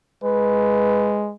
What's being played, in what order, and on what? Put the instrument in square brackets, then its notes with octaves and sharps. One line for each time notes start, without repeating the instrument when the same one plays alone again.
[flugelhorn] G#3 [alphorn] B4